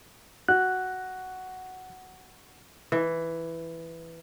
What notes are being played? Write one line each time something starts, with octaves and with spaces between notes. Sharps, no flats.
F#4 F#6
E3